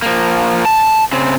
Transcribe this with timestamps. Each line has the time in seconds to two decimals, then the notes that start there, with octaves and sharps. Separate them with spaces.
0.02 F3 A#3
0.65 A5
1.12 C#3 C4